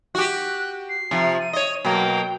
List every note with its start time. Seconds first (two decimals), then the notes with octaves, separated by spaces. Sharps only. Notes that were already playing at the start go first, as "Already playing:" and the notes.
0.15 F#4 G4 F#6
0.89 C7
1.11 C3 F3
1.39 D#7
1.53 C#5 D#5
1.85 B2 F#3 A#3 G5